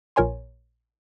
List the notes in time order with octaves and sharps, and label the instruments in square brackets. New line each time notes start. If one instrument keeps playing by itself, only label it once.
[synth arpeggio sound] A#1 A#2 A#4 C#5 G#5 C6